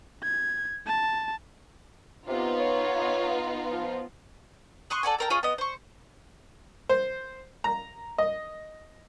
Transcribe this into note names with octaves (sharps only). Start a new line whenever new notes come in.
G#6
A5
C3 B3 D#4 F4
C#5
F3
C6 C#6 D#6 F#6
A4 D5 F#5 G#5
A4 A#4 G5
F4 G#4 C#5 D#5
B3 D#5
C5 C#6
C5
A#5
D#5